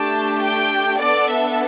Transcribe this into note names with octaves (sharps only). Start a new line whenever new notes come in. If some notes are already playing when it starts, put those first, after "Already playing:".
Already playing: A3 D4 G4 A5
G5
B3 D4 A4 D5
E5